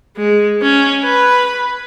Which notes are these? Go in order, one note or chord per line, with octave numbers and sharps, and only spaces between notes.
G#3
C#4
B4 B5